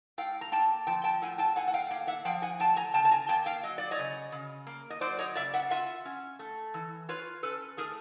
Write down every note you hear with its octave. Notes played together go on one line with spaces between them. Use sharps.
A2 F5 G5
A#5
A#3 G5 A5
F3 G5 A5
G5 A5
A2 F#5 G#5
G5 A5
A2 F#5 G#5
F#5
F5 G5
A#3 F5 G5
E5 F#5
F3 F5 G5
F#5 G#5
A2 G5 A5
G#5 A#5
C#3 G5 A5
A5
G#5 A#5
A#3 G5 A5
F5 G5
F#3 D#5
D5
C#5 D#5
C#3
C#3
A#3
D#5
F#3 C5 D5
C#5 D#5
C#3 D5 E5
E5 F#5
F4 E5 F#5
C#4
A3
E3
F4 B4 C#5
C#4 A4 B4
A3 G#4 A#4